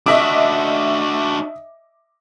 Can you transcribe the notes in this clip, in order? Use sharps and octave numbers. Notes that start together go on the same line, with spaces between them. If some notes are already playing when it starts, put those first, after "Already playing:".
D4 F#4 D#5 E5 D6